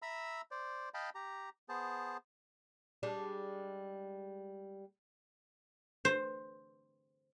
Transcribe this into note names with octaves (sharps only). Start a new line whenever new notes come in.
E5 A#5 B5 E6
C5 D5
D#5 F5 G5 A5 B5
G4 A#5
B3 G#4 C5 A5
G3 G#3 D4
C5